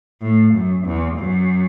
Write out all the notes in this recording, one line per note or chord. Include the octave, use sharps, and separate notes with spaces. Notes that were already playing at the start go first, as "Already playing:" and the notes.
A2
F#2
E2
F#2